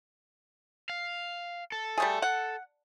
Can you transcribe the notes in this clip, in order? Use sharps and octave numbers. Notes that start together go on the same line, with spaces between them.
F5
A4
G3 A3 G#4
F#5